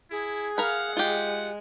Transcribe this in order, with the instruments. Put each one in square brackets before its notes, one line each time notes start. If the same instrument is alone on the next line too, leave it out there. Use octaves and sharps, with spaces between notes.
[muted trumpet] E4 [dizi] G#4
[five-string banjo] A#4 B5 [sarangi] F5 [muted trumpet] F#5
[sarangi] G#3 [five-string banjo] F4 G4